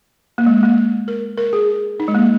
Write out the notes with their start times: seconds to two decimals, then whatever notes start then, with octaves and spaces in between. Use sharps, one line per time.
0.38 A#3
0.46 G#3
0.63 A#3
1.08 A#4
1.38 A#4
1.53 G#4
2.00 D#4
2.08 G#3
2.15 A#3